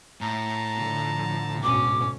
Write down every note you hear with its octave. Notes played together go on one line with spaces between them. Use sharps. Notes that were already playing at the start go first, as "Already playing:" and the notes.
A2 A5 A#5
D3 F3
D2 G#2 B2 C#4 D6